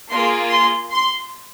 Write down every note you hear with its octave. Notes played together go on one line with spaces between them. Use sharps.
A#3 F4 G#4 C6
C6
C6